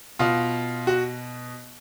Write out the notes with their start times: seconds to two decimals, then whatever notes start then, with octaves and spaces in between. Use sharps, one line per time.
0.19 B2 F4
0.87 F#4